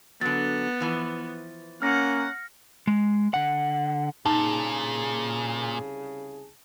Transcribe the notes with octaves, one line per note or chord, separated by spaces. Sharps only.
D3 F#3 B3 A6
E3 F3
A#3 C#4 F#5 F6 A#6 C#7
G#3
D3 F#5
C2 A#2 C#3 D#4 G#4 A5